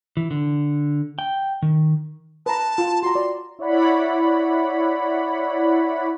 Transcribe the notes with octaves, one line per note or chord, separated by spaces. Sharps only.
E3
D3
G5
D#3
B4 A5 A#5
F4
F#4 A#5 C6
D5
E4 C#5 D5 F#5 B5